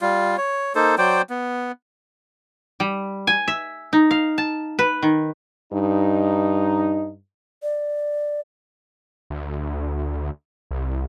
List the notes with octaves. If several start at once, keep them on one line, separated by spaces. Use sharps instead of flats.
G3 F4
C#5
A#3 D#4 A4 C5
F#3 C5 D5 G5
B3
G3
G#5
E5
D#4
F5
A5
B4
D#3
G2 D#4
D5
D2
C2